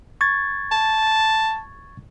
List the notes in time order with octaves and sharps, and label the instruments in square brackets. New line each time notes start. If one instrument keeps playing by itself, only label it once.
[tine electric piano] C#6 G#6 A6
[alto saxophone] A5